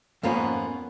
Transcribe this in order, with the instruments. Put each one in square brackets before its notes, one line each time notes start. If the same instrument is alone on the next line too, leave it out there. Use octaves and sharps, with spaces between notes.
[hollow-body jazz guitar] F2 G#2 F3 A#3 B3 C#4